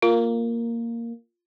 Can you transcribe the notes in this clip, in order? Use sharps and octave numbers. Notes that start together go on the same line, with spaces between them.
A#3 F4